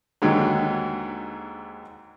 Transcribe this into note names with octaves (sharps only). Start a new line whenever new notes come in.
D#2 G#2 D3 F#3